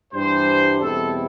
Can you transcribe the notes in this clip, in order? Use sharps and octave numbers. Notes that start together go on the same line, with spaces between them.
G2 E3 G3 D4 C5
E2 B2 G3 C4 E4 A4